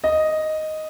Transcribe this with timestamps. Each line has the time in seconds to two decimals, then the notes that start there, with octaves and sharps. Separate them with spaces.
0.04 D#5